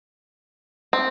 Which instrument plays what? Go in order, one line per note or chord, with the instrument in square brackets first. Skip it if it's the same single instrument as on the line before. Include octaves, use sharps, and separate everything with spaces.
[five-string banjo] C4